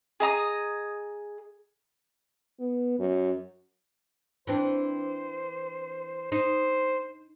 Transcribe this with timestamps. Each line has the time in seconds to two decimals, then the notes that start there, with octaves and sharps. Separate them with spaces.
0.20 G#4 D#5 A#5 D#6
2.60 B3
2.99 F#2
4.47 E3 C4 D4 C5
6.32 D#4 C5